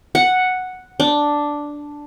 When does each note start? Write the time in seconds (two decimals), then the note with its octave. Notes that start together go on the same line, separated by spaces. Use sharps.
0.15 F#5
1.00 D4